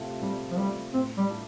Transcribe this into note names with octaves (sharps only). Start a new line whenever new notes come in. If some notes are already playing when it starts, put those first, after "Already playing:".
Already playing: C3 A3 F4 A4
C3 G3
F3
G3 A3 F4 A4
A2 C4
G3
A3 D4 F4